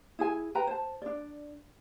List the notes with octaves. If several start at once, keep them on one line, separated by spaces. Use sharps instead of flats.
E4 G#4 G#5
B4 G5 A#5
C5 A5
D4 D5